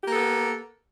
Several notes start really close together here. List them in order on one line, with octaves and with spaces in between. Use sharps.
G4 A#3 A4 B3